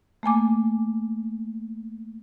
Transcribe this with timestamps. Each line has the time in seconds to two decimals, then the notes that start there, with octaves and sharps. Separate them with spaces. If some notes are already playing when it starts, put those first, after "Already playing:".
0.23 A3 A#3 G#5 D6